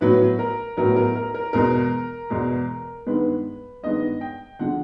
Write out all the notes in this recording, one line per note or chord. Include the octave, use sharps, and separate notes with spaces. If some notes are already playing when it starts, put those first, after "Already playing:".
A2 F#3 B3 B4
A#4
A2 F#3 B3 A#4
A#4
A#4
A#4
E2 B2 G#3 A#4
E2 B2 G#3
G2 D#3 G#3 B3 B4
G2 D#3 G#3 B3 D#5
G5
D3 F3 G#3 F#5